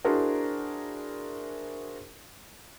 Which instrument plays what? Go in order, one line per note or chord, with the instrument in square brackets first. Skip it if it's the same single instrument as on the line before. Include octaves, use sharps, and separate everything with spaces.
[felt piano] D4 E4 F#4 G#4 A#4 C5